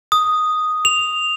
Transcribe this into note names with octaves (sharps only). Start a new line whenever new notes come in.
D#6
F7